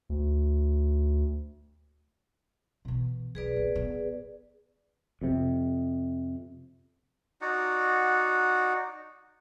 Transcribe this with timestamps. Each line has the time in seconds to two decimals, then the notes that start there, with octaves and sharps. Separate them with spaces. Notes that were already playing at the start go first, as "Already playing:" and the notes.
0.10 D2
2.85 B2 E3
3.35 B1 G#4 B4 D5
3.56 A#2
3.75 B3
5.21 F2 C3
7.41 D#4 F#4 D5 F#5